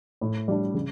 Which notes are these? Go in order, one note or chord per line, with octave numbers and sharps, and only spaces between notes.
A2
G3 D4
C#3